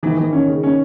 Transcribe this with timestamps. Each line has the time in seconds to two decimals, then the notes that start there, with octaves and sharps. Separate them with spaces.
0.03 D#3 E3
0.17 E3
0.33 C#4
0.48 C#3
0.63 C#4